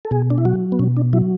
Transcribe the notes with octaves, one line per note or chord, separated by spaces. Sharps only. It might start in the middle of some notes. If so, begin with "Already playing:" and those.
A4
B2 G#4
D4
E4
F#3 F#4
B3
B2 C#4
D4
F#3 E4